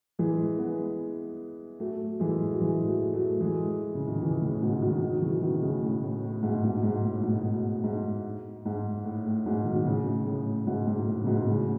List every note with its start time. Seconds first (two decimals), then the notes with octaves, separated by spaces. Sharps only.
0.19 E3 G#3
0.58 G#3 B3
1.80 F#3 A3
2.19 E3 G#3
2.52 F#3
2.60 E3 G#3
2.87 F#3 A3
3.13 F#3 A3
3.40 E3 G#3
3.95 C#3
4.08 D#3
4.22 C#3 E3
4.42 A2 C#3
4.62 G#2 B2
4.82 D#3 F#3
5.02 D#3 F#3
5.13 F#3
5.22 C#3 E3
5.42 B2 D#3
5.62 A2 C#3
5.83 A2
6.03 A2
6.24 A2
6.43 G#2 B2
6.63 G#2 B2
6.83 G#2
7.04 A2
7.23 G#2 B2
7.44 A2
7.84 G#2
8.65 G#2
9.05 A2
9.26 A2
9.46 G#2 B2
9.65 B2 D#3
9.76 B2
9.85 A2 C#3
10.25 A2 C#3
10.67 G#2 B2
10.87 G#2
11.07 A2
11.21 C#3
11.26 G#2 B2
11.47 A2 C#3